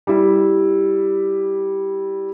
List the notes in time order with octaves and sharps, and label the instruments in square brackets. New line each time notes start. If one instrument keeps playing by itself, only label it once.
[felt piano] G3 E4